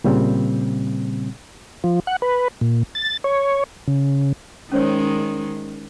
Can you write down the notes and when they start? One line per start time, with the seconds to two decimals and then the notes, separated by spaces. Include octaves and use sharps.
0.04 A#2 C#3 G3 C4
1.84 F3
2.07 F#5
2.22 B4
2.61 A#2
2.95 A6
3.24 C#5
3.88 C#3
4.72 D#3 G#3 C#4 C5 C#5